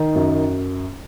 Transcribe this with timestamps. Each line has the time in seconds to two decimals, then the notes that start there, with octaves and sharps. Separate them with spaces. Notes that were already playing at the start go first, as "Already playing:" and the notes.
Already playing: D#3
0.15 F#2